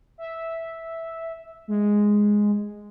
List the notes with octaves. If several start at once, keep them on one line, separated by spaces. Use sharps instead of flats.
E5
G#3